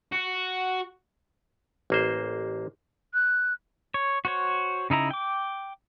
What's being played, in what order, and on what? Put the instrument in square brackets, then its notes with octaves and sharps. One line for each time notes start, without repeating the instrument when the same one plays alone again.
[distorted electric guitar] F#4
[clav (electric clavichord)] A1 A#3 C5
[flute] F#6
[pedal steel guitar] C#5
F#4 C5 C#5
C#3 D#4 E4 A#5
G5 D6